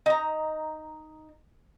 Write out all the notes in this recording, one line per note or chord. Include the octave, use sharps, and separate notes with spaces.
D#4 A#5